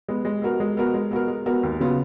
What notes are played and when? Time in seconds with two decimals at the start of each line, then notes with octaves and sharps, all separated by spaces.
0.09 G#3 B3
0.25 G#3
0.42 B3 F#4 A#4
0.60 G#3
0.77 B3 F#4 A#4
0.94 G#3
1.11 B3 F#4 A#4
1.28 G#3
1.46 B3 F#4 A#4
1.63 D#2
1.80 C#3 F#3 B3 F4